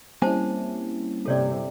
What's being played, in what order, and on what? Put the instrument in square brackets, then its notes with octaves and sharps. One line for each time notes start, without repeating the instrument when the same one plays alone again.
[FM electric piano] G3 C#4 E4 [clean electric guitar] A#3 C4 G#5 [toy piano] C5 A5
[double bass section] G1 C3 [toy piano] A4 C#5 D5